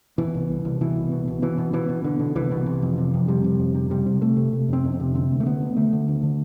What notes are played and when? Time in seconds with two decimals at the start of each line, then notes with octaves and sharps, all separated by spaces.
0.18 B2 E3
0.34 C2
0.49 C2
0.65 C2
0.81 B2 E3
0.96 C2
1.12 B2
1.27 B2
1.42 B2 E3
1.58 B2
1.73 B2 E3
1.89 B2
2.04 B2 D3
2.20 B2
2.35 C2 E3
2.51 B2
2.66 C3
2.82 F2
2.97 C3
3.14 F2
3.28 C3 G3
3.44 C3
3.59 F2
3.75 C3
3.90 C3 G3
4.06 C3
4.22 C3 A3
4.37 C3
4.53 C3
4.69 F2 C4
4.84 F2
4.94 C4
5.00 C3
5.14 D3 C4
5.30 D2
5.40 A3
5.46 D3 B3
5.62 D2
5.77 D3 A3
5.93 D3
6.08 D2
6.23 D3